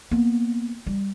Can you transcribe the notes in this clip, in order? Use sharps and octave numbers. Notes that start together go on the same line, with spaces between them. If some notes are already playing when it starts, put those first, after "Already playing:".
A#3 B3
G3